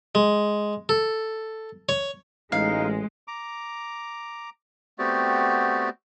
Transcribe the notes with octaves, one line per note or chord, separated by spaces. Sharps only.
G#3
A4
C#5
A1 G#3 D#4 F5
A#5 D6
A3 B3 C4 F#4 G4 D5